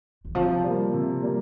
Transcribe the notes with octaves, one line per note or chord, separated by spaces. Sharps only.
D#3
C3 F3
G3 A#3
C3
G3 A#3